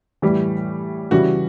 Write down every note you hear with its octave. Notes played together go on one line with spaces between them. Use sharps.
A2 E3 G3
C#3 E3 G3 F#4